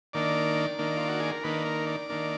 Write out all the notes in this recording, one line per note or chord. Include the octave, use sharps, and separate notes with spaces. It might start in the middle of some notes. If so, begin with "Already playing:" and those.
D#3 A#3 D4 D5
D#3 A#3 D4
F4
F#4
G#4
A#4
D#3 A#3 D4 B4
A#4
D5
D#3 A#3 D4